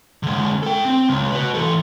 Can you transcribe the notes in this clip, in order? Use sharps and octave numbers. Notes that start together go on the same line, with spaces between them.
D3 G#3
A4 G5
C4
C#2
F#4 B4
E3 A4